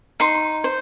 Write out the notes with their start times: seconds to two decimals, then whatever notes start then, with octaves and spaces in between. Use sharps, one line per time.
0.20 D#4 C6
0.64 C5